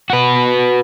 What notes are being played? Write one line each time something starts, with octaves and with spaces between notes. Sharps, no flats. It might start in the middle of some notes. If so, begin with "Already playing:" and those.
F#4 B4